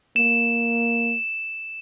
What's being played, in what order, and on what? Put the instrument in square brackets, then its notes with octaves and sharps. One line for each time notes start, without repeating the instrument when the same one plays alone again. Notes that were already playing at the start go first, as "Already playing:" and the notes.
[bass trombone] A#3 [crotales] E7